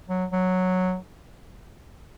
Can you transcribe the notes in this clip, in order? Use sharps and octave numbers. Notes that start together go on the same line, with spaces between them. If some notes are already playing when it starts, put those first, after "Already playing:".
F#3
F#3